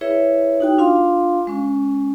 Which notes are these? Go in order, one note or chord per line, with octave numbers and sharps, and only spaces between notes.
E4 G#4 B4 C#5 E5
D#4 F#4 G5
D4 F4 F5 C6
G#3 C#4